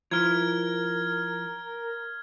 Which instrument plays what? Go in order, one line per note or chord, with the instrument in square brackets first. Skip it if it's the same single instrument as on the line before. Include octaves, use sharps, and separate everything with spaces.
[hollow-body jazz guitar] F3 E4 [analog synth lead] A#4 [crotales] F6 G#6